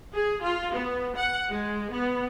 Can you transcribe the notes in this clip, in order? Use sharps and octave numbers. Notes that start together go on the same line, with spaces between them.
G#4
F4
B3
F#5
G#3
B3